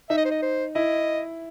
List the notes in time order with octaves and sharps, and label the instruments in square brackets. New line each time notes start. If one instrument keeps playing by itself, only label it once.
[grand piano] D#4 [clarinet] E5
[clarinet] D#5
C5
D#5
C5
[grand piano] E4 [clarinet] D#5